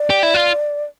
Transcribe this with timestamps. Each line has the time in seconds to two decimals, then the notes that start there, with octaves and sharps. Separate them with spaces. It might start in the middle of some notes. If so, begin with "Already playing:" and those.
Already playing: D5
0.10 G4
0.23 E4
0.34 F4